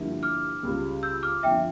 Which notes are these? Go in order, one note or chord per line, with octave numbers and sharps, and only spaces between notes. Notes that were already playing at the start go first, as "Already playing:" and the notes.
Already playing: G2 D3 F3 A#3 E4
D6 F6
C#2 C#3 G3
E6 G6
D6 F6
G1 F2 D3 F3 E5 G5